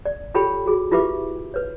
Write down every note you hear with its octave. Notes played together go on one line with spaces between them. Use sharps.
D5
F4 G4 A4 C#5 G5 B5
F#4 G#4
E4 F4 G4 B4 E5 D6
B4 C#5